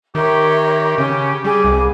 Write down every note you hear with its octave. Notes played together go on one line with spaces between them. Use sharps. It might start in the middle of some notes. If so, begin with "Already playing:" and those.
D#3 G4 A#4 C#5 E5
C#3 C#4
G3 G#4 D6
C2